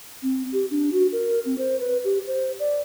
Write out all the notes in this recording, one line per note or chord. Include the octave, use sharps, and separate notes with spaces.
C4
G4
D4
F#4
A#4
C4
C5
B4
G4
C5
D5